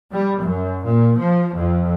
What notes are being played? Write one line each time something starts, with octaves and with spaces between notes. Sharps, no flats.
G3
F#2
A#2
F3
F2